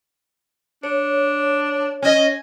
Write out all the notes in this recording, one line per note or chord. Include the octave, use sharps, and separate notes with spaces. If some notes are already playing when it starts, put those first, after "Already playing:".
D4 C#5
C#4 D#5 G#5